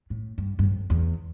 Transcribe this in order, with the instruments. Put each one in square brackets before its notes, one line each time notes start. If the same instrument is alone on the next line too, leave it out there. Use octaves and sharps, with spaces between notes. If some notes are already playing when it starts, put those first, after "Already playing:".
[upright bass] A2
G2
G2
F2
E2